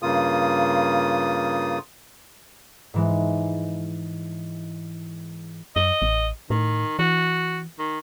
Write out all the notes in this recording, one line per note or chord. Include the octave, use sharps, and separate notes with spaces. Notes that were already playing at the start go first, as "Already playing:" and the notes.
G2 C#3 A#3 F4 D#6
G#2 E3 G#3
F#2 D#5
A1
A2 D#3
E3 F#4
D#3